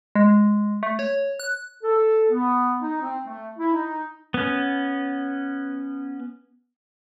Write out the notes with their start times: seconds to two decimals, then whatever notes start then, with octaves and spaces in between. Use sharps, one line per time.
0.15 G#3
0.83 A3
0.99 C#5
1.40 F#6
1.83 A4
2.31 B3
2.80 D#4
3.01 C4
3.26 A3
3.59 E4
3.73 D#4
4.34 B3 C#4